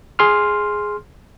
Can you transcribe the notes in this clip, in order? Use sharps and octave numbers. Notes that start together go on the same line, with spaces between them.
G#4 C6 F6